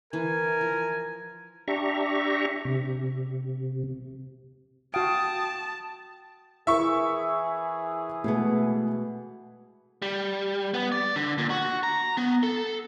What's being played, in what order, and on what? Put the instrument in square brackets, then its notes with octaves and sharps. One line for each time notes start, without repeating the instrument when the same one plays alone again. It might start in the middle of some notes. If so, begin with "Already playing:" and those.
[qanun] E3 [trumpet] A#4 [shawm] G#5
[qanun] F3
[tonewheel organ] D4 G4 E5 A#5 C#6
C3
[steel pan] F#4 F5 [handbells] G5 [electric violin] A5 [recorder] D#6
[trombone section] E3 G#4 [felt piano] E4 A#4 [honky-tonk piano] E5 C#6
[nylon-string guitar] B2 G#3 B3 [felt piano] A3
[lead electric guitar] G3
B3
D5
D3
A#2
F#4
A#5
B3
A4